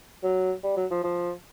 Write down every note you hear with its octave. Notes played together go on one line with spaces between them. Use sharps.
F#3
G3
F#3
F3
F3